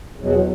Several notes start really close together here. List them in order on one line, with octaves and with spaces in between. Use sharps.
E2 B2 F#3